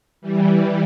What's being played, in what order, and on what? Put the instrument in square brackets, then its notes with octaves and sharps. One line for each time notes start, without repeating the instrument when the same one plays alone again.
[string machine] E3 G3